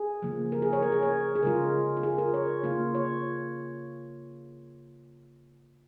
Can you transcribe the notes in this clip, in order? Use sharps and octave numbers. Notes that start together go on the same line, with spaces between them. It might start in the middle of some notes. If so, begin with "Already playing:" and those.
Already playing: G#4
C#3 F3 A#3
A#4
G#4
C#5
A#4
G#4
C#5
G#4
C#3 G#3 F4 A#4
F4
G#4
A#4
C#5
C#3 A#3 F4
C#5